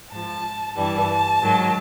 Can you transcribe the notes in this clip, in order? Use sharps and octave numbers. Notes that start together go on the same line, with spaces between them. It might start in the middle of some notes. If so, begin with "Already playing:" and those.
G#2 F3 A5
G2 E3 G3 A5
G#2 D#3 F#3